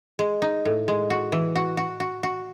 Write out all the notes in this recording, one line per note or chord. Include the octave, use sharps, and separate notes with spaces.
G#3
D#4
A2
G#3
F#4
E3
F#4
F#4
F#4
F#4